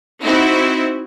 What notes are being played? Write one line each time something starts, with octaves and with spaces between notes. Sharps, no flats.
C4 D#4 E4 F#4